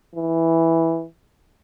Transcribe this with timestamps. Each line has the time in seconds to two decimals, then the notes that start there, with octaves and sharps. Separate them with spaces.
0.16 E3